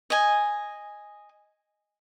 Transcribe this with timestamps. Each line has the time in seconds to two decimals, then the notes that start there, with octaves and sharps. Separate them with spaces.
0.10 D#5 G#5